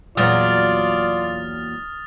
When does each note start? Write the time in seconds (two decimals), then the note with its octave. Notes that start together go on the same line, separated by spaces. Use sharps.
0.17 E2 A#2 F#3 F4 D5 D#6 F6 A6